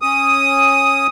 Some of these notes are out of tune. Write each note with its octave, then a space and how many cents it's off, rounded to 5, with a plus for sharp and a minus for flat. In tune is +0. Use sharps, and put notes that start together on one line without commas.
C#4 -20 D#6 +5